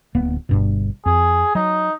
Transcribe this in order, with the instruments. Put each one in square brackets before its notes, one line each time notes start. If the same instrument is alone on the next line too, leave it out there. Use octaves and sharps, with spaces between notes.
[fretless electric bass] D1 A#3 B3
G1 G2 B2
[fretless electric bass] F2 [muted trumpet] G#4
[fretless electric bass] F#3 [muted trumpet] D#4